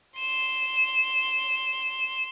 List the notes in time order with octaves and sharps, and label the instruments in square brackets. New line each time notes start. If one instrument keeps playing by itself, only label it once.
[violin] C6 E7